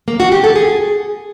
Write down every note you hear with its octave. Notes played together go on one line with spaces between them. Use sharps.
A#3
F#4
G4
A4
G#4